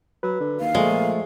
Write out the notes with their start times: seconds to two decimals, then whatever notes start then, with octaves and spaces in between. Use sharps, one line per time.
0.23 F#3 B4
0.40 D3
0.60 D#2 F5
0.75 A#2 F3 G#3 A3